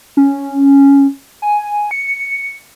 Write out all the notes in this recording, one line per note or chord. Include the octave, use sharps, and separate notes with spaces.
C#4
G#5
C#7